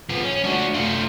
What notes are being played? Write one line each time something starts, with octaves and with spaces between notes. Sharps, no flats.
F3 B3
C#4
D4 F#4
A3 F4